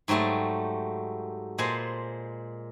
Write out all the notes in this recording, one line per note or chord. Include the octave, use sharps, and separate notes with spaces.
G#2 F#3 G3 A3 A5
A#2 G#3 C5 G#5 A5 B5